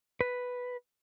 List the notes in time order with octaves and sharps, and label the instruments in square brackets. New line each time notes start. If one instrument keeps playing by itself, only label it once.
[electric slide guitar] B4